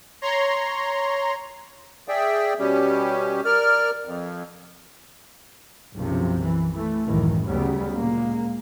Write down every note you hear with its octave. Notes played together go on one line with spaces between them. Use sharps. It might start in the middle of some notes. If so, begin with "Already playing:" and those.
C#5 A#5 C6
G#4 D5 E5 G5
B2 G3 C#4 G4
A#4 D5 F6
F2
F#1 B1 F#2 C3 F3
E3
E3 A3
F#1 C#2 A2 D#3 E3
D2 C#3 F#3 G3 B3
A#2 G#3 A#3